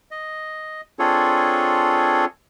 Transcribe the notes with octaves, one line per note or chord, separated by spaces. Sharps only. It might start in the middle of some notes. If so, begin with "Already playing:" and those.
D#5
C4 D4 F4 G#4 A4 C#5